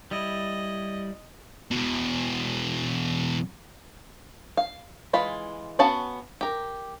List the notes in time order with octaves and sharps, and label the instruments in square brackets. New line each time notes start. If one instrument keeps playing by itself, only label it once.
[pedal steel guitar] G3 E4 [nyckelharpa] D#5
[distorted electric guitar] E2 B2
[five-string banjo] F5
E3 G#3 F4 B5
B3 C#4 F#4 F5 A5
G4 A#4